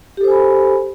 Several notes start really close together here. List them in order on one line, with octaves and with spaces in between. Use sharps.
G4 A4 C5 G#5 B5